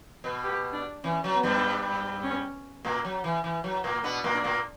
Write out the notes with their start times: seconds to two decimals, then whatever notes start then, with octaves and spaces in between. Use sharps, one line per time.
0.24 B2 B3
0.43 G4
0.73 D4
1.04 E3 C#4
1.24 F#3
1.33 B3
1.43 G2 G3
2.24 C#4
2.85 A#2 A#3
3.05 F#3
3.24 E3
3.44 E3
3.64 F#3
3.84 A#2 A#3
4.04 B2 B3 D4
4.24 A#2 A#3
4.34 D4
4.44 A#2 A#3